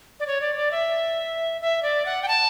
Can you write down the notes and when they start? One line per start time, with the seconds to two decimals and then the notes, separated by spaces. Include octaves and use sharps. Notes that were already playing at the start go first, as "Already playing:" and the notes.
0.20 D5
0.27 C#5
0.41 D5
0.56 D5
0.71 E5
1.61 E5
1.83 D5
2.06 F#5
2.22 G5
2.28 A5